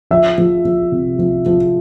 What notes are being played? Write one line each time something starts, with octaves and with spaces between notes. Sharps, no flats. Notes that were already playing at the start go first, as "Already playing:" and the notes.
F3 E5
F3
F3
C3
F3
F3